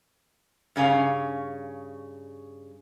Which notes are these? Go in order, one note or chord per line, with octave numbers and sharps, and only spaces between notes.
G2 C#3 C#4 F5